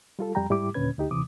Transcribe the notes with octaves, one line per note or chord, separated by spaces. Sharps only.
G3 F4 A4
F2 G3 G5 A#5
G#2 G3 E4 G4 D6
D#2 A#2 D3 C#4 B4 G#6
D2 D#4 G4
D#2 C3 E3 D6 D#6